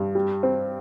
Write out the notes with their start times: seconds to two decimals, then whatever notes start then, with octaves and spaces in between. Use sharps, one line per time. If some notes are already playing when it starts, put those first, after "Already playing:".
Already playing: G2
0.15 G3
0.43 C4